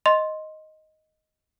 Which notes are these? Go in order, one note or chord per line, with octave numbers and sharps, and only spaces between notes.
D#5 C6